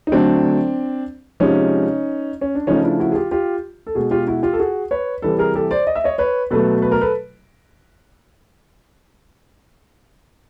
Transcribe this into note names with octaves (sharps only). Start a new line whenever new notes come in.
D#4
D3 F#3 A3 C4 D4
C3 F3 G#3 C#4 D#4
C#4
D4
C#3 F3 A3 C#4 D#4
D4 E4
E4 F#4
G#4
F4 G4
F4 G4
A4
B2 G#3 F#4 G#4
F4 G4
E4 F#4
F4 G4
A4
F#4 G#4
B4 C#5
C3 E3 G3 A4 B4
G#4 A#4
G4 A4
C5 D5
D#5
E5
C#5 D#5
B4 C#5
B2 F#3 A3 A4 B4
B4
A#4
A4 B4